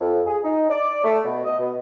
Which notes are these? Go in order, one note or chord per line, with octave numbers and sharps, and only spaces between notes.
F2
G#4
D#4
D5
A3
B2
D#5
B2